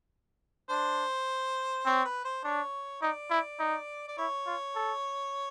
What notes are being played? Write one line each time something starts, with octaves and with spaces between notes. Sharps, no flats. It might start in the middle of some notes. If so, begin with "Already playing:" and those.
D4 C5
C4 C#5
B4
C5
D4 C#5
D#4 D5
E4
D#4
D5
E4 C#5
F4
A4